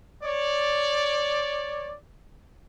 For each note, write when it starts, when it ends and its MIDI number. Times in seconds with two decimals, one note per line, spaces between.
0.23 1.94 73
0.23 1.94 74